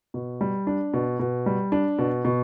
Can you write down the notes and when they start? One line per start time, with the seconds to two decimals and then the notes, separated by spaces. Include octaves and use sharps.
0.14 B2
0.41 G3
0.67 D4
0.94 B2
1.19 B2
1.46 G3
1.72 D4
1.98 B2
2.25 B2